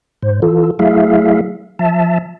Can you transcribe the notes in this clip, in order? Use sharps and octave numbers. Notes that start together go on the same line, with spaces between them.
G#2 C5
E3 F4 A4
F#3 A3 E4 G#4 E5 F5
F3 E5 A5